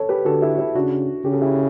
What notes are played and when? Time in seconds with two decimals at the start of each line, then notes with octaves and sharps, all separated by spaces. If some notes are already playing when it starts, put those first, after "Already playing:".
Already playing: A4 C#5
0.09 G4 B4
0.25 D3 F#4 A4
0.42 E4 G4
0.59 E4 G4
0.75 C#3 D4 F#4
1.24 C#3 G4
1.33 A4
1.41 E4 G4